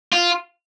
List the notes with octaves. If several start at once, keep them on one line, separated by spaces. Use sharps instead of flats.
F4